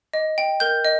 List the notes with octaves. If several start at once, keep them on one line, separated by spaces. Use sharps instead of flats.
D#5
G5
A#4 G6
D#5